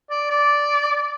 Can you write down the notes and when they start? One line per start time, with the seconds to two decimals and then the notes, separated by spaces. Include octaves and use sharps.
0.10 D5
0.30 D5